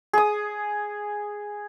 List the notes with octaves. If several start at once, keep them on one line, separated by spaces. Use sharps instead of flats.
G#4 D#6